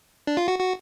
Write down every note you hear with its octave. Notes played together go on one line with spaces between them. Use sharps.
D4
F4
F#4
F#4